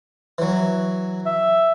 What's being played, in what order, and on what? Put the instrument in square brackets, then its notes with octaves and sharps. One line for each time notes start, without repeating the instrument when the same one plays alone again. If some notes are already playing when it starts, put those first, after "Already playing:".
[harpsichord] E3 F#3
[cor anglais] E5